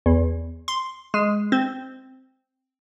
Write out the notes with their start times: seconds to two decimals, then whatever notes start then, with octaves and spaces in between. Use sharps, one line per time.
0.06 E2
0.68 C6
1.14 G#3
1.52 C4